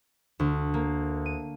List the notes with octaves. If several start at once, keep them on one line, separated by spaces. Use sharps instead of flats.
D2
A#3
D#7